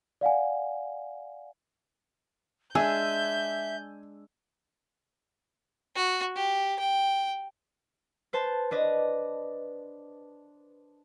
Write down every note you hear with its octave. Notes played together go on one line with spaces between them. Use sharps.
D5 F5 F#5 G#5
G#3 D4 G#4 E5 G#5 E6 G6
F#4
G4
G5
B4 C5 A5
D4 B4 D#5